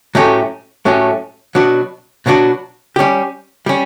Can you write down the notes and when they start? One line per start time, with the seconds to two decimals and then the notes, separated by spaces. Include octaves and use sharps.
0.15 A2 F#3 A3 C#4 G4
0.85 A2 F#3 A3 C#4 G4
1.55 B2 F#3 B3 D4 F#4
2.26 B2 F#3 B3 D4 F#4
2.96 G3 C#4 G4
3.66 G3 C#4